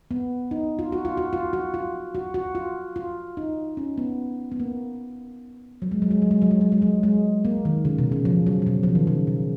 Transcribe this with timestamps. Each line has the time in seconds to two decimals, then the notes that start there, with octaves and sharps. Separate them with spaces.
0.11 B3
0.51 D#4
0.79 F4
0.92 F#4
1.05 F4
1.17 F#4
1.33 F4
1.53 F#4
1.74 F4
2.15 F#4
2.34 F#4
2.55 F4
2.96 F4
3.37 D#4
3.77 C#4
3.98 B3
4.52 B3
4.60 A#3
5.82 F#3
5.91 G#3
6.02 F#3
6.11 G#3
6.22 F#3
6.31 G#3
6.42 F#3
6.51 G#3
6.61 F#3
6.72 G#3
6.82 F#3
7.03 G#3
7.45 A#3
7.65 D#3
7.85 C#3
7.98 B2
8.12 C#3
8.25 F3
8.46 F#3
8.62 C#3
8.66 B2
8.83 F3
8.95 D#3
9.07 C#3
9.27 B2